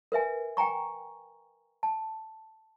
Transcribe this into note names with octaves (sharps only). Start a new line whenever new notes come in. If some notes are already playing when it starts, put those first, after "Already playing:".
A#4 B4 E5 G#5
G5 G#5 A#5 C#6
A5